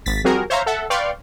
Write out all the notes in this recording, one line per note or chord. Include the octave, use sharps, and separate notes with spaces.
G#1 A6 B6
F3 G3 C4 F#4 G#4 A#4
C5 C#5 E5 F5 A#5
A4 E5 F#5
B4 D5 F5 G5 C6 C#6